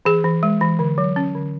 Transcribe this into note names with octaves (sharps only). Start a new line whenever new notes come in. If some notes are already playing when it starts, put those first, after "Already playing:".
E3 G#4
E3
G#3
E3
D3
F#3
C#4
D3